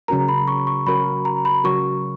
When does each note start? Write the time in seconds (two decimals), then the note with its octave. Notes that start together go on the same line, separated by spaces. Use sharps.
0.08 C#3 F#3 C#4 F#4 A#4 A#5
0.28 B5
0.48 C#6
0.67 C#6
0.87 C#3 F#3 C#4 F#4 A#4 B5
1.25 A#5
1.45 B5
1.64 C#3 F#3 C#4 F#4 A#4 C#6